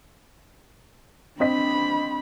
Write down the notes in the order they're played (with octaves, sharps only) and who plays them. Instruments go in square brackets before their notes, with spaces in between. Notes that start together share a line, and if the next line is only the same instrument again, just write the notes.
[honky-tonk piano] C4 D#5 B6 [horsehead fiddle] D4 B5